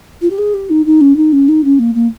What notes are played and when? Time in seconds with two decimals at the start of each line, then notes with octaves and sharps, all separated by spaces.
0.21 F4
0.30 G4
0.38 G#4
0.54 G4
0.70 D#4
0.85 D#4
1.01 C#4
1.16 D#4
1.32 C#4
1.48 D#4
1.64 C#4
1.79 A#3
1.94 A#3